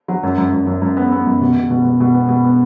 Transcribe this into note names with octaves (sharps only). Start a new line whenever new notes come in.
F#3
F#2
F#2
F#2
F#2
F#2
B3
B3
F#2
B2
B2
B2
B2
B2
B3
B2
B3